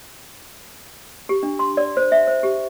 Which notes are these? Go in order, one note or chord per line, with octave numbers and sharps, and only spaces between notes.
G4
D4
C6
D5
C5
E5
C5
G4